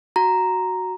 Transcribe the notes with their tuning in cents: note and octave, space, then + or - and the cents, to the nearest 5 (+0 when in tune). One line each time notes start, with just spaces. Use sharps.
F#4 +0 A#5 +0